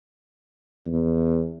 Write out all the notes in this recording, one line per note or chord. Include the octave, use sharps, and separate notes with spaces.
E2